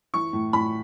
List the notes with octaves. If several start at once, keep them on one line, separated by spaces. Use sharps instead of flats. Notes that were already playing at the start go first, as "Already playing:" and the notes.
E3 C#6
A2
A2 B5